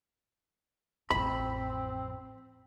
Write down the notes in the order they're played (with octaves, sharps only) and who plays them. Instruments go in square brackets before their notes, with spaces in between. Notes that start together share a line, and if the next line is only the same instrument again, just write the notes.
[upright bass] A1 F2 [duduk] C4 [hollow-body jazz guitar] B5